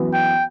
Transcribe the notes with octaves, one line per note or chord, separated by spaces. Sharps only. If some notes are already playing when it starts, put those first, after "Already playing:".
Already playing: F#2 E3 B3 F#4 B4
G5